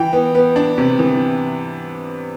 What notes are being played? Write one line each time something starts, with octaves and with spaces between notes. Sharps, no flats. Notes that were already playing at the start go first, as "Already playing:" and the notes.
Already playing: E3 G5
B3
B3
D4
C3
E3